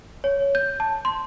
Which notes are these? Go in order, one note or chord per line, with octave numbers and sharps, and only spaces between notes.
C#5
G6
A5
C6